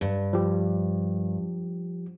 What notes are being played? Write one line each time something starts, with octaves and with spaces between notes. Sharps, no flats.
G2
F3 G4